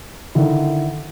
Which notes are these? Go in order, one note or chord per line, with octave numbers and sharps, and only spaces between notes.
D3 D#3 E4